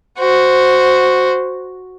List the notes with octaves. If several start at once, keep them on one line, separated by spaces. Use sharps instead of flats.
F#4 C5